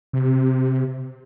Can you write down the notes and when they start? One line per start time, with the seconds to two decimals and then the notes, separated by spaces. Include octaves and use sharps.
0.13 C3